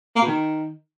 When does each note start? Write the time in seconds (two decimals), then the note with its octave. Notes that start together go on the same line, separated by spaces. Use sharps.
0.16 A#3
0.22 B2
0.27 D#3